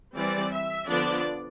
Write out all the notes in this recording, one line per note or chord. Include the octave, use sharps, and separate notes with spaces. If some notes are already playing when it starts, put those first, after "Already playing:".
E3 G3 C4 D5
E5
D3 F3 B3 D4 D5